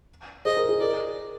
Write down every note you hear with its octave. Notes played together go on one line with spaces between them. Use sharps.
G#4 C5 D#5
A#4
G#4
A#4 D5